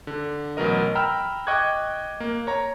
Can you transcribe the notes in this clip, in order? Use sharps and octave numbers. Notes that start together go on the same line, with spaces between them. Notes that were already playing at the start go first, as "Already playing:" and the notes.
D3
A1 B2 F#3 A#4 D#5
G5 A#5 B5 E6 F6
D#5 G5 C#6 D6 F#6 G#6
A#3
C#5 A#5